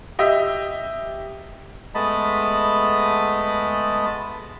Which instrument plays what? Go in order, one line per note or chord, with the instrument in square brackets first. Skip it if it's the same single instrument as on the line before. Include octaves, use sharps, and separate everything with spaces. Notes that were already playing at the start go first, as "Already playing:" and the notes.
[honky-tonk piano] G4 D#5 E5
[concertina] G#3 A3 B3 D#5 A5 B5